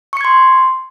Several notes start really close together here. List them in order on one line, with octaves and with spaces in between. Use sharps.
C#6 C#7 G#6 C6